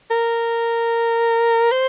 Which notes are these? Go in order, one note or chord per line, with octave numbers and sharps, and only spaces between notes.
A#4
C5